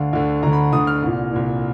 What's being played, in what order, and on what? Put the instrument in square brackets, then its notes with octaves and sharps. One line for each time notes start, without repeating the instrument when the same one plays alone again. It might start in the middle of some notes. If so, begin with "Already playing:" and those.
Already playing: [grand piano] D2 D3 F5
D2 D3
D2 D3 A#5
B5
D2 D3 D#6
F6
C2 A#2
C2 A#2